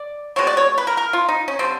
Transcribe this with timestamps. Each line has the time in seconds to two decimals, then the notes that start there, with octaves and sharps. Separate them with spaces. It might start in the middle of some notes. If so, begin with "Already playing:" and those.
Already playing: D5
0.36 B2 G#3 C4 C#5
0.47 D5
0.57 C#5
0.78 B4
0.87 A#4
0.97 A#4
1.13 F4
1.29 D#4
1.48 C#4
1.59 D3 G3 A#3 C4